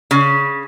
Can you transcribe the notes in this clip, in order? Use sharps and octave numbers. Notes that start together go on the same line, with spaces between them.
C#3